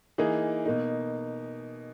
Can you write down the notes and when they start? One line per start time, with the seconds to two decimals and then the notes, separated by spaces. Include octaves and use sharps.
0.18 E3 A#3 D#4 G#4
0.65 B2 A#3 D#4